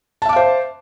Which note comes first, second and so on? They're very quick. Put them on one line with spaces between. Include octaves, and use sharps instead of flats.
A5 E5 D6 F5 C5